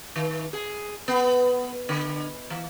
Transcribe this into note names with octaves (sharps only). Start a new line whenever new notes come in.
D#3
G#4
B3
D3
E3